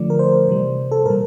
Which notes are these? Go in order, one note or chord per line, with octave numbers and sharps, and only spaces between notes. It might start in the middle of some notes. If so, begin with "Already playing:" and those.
Already playing: D3 F3 A3 D5
A#4
C5
C3 E3 G3
A4
A#2 G3 A#4